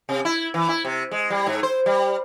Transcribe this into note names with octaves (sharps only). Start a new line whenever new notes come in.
C3
E4
E3
E4
C3
G#3
G3
G#2
C5
G3